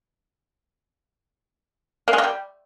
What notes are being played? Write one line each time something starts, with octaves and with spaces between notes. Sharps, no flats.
A#3
G#3
A#3
G3